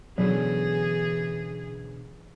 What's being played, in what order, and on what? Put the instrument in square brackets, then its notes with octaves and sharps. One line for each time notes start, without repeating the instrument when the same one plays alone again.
[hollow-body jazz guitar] B2 D3 C#4 [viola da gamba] E3 G#4 [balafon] F#3